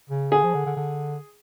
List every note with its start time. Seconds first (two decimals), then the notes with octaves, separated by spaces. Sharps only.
0.10 C#3
0.32 D3 G#4
0.43 F3
0.54 D3
0.66 D3
0.77 D3